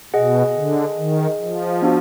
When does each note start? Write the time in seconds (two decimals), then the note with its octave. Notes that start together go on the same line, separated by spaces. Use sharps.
0.13 B2 G#4 D#5 F#5
0.55 D3
0.97 D#3
1.40 F3
1.82 B3 D4 F#4